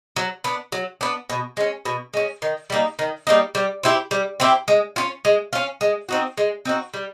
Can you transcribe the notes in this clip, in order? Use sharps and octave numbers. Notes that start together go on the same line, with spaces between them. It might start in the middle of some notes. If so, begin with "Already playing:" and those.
F#3
B3 D4
F#3
B3 D4
B2
G#3 C#4
B2
G#3 C#4
D#3
G3 A#3 D#4
D#3
G3 A#3 D#4
G3
C4 E4 G4
G3
C4 E4 G4
G#3
C#4 F4
G#3
C#4 F4
G#3
C4 D#4 F#4
G#3
C4 D#4 F#4
G3